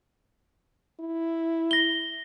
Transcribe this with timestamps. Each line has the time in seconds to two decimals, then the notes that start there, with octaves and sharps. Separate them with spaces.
1.00 E4
1.71 A#6 G7